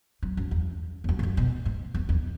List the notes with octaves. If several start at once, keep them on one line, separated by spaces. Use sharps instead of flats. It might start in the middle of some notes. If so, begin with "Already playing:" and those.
F#3
F#2
E2
E2
F#2
G#2
F#2
B2
G#2
E2
E2